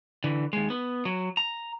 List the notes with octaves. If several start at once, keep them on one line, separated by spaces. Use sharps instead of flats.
D3 E3
D#2 G#3
B3
F#3
A#5